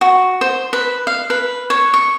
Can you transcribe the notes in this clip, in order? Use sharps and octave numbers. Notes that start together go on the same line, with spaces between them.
F#4
C5
B4
F5
B4
C#5
C#6